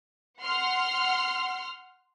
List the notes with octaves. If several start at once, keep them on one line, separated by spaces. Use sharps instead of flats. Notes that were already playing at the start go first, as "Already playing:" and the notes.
F#5 C6 F6